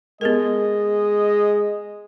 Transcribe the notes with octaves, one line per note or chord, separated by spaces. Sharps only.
G#3 B3 G4 A#4 D#5